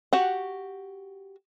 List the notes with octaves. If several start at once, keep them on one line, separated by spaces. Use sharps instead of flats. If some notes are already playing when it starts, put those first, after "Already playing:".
F#4 G4 F#5